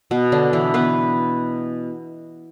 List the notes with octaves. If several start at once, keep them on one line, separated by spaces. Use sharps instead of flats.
B2 B3
D3 D4
E3 E4
B3 B4